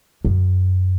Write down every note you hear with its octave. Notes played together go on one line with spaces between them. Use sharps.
F#2